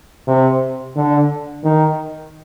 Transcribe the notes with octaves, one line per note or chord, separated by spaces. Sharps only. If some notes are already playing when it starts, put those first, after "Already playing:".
C3
D3
D#3